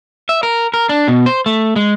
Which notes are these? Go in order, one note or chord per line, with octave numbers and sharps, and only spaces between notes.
E5
A#4
A#4
D4
B2
C5
A3
G#3